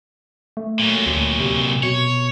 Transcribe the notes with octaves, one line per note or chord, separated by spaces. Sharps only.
A3
A#2 F#3
D2
C3
B2 C#5